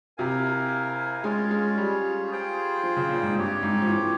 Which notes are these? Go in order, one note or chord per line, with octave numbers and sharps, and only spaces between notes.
C3 E4 A#4 F5 G#5
G#3 C#4 F4 G#4 C#5
G#3
G3
F4 G#4 C5 G5
F3
C#3
A#2
G#2
G2 C4 G4 C#5
G#2
F3
E3